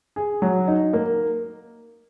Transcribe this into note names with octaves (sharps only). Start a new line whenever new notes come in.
G#4
F#3
D#4
A#3